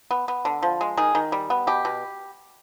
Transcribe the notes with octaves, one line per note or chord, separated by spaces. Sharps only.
B3
B3
D3
F3
G#3
D#3 G#4
D#3
G3
B3
B2 G4
B2